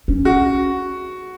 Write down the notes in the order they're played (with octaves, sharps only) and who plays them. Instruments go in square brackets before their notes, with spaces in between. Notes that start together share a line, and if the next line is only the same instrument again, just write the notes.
[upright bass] C#4
[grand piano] F#4